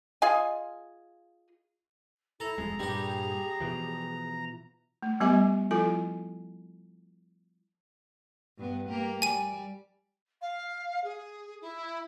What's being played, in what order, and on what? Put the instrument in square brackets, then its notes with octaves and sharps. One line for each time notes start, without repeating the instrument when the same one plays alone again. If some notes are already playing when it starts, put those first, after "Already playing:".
[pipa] F4 G#4 D#5 G#5
[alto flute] E4 [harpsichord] A4 [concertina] A#5
[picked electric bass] E1 F2 G#3 [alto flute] G#4
[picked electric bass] G2 A#2 [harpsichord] G3 G4
[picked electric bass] B2 E3 F3
[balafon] A3
G3 B3 G4 D#5 G#5 D6
F3 E4 F4 A4 G#5
[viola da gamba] G2 B3
A#3 G4 A#4
[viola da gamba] G3 D5 [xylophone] G#5 D#7
[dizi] F5
G#4
E4